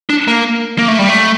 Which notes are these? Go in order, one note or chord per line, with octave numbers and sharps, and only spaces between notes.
D4
A#3
A#3
A3
G3
A3